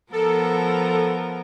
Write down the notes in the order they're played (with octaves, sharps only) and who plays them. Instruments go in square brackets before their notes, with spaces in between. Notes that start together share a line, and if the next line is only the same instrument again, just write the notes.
[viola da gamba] F3 B3 A#4 [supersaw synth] A4